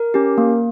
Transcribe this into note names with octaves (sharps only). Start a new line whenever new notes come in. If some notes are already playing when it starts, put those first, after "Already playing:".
Already playing: A#4
C#4 G4
A#3